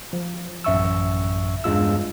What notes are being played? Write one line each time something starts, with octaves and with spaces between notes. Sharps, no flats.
F3
A1 F#2 E5 C#6 E6
E2 G2 G#3 F4 E6